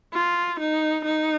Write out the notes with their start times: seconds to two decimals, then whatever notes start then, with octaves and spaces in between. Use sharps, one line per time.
0.14 F4
0.60 D#4
1.05 D#4